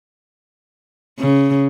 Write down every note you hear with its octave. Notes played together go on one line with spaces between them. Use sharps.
C#3